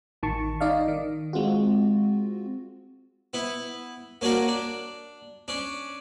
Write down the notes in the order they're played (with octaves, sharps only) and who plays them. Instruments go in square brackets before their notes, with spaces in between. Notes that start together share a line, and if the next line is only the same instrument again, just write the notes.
[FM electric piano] A1 D#3 A5 C#6
D#4 D5 D#5 F5
D#3
G#3 C4 F4 F#4
[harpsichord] B3 E4
A#3 C#4 D4 F#4 A#4
D4
C#4 D4